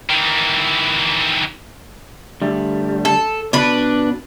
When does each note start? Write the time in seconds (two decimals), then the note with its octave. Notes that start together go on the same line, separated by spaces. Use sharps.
0.10 D#3 E3
2.42 D3 G3 A3
3.05 A4
3.53 B2 D4 B4